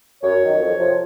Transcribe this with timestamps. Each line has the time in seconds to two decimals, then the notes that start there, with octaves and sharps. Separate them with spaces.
0.23 F#2 C#5
0.42 D#3 F#3
0.60 F2
0.79 C3 F3